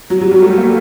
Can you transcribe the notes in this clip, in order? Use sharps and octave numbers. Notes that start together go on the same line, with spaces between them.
F#3 F#4
F#3 G4
G3 F#4
A3
A#3